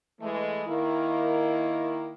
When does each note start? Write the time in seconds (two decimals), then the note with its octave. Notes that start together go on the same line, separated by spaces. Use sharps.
0.20 E3 G#3 A3
0.67 D#3 A#3 E4